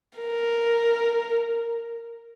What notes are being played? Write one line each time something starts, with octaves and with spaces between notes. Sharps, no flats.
A#4